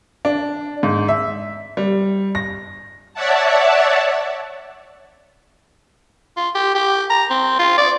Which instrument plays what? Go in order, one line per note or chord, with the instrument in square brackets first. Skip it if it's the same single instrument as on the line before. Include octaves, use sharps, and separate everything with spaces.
[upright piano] D4
G#2
E5
G3
A#6
[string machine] C#5 D5 E5 F#5 A5
[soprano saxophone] F4
G4
G4
A#5
C4
F4
D5